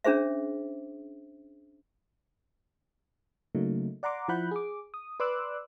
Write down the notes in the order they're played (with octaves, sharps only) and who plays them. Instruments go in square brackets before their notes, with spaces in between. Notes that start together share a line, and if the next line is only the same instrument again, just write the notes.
[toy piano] C#4 D4 G#4 C5 E5
[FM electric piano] C#3 F#3 A3 A#3 D#4
D5 F#5 A#5 C6 D6
F3 E4 F#5 B5 F#6 G6
G#4 D6
D#6
B4 D5 C6 D6 E6 F#6